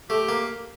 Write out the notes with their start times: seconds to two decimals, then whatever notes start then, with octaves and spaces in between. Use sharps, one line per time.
0.10 A3 G4
0.29 A#3